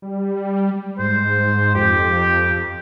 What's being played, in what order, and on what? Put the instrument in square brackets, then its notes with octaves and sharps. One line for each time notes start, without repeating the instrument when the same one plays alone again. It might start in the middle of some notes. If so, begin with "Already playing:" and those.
[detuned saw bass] G3
[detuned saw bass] G#2 [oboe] C5
[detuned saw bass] F2 [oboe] G4